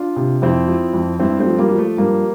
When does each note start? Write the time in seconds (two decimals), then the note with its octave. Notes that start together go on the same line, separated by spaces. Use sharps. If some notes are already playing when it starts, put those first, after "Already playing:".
Already playing: D4 F4
0.16 C3
0.42 F2 C4 E4
0.68 F3
0.94 F2
1.20 G2 C4 E4
1.39 A3 C4
1.46 F3
1.59 G3 A#3
1.71 F3
1.78 A3
1.97 G2 G3 A#3